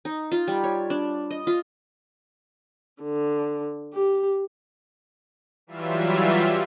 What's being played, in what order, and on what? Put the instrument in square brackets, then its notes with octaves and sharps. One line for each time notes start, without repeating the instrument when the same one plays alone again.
[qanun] D#4
F4
G3
C#5
D4
D#5
F4
[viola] D3
G4
[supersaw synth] E3 F#3 G3 F4 E5